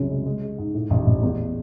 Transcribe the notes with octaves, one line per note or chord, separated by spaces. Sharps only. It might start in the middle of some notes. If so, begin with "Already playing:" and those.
Already playing: C2 F#2 C#3 C#4
G#3
G#3
G#3
G#2
A2
A1
A1
E2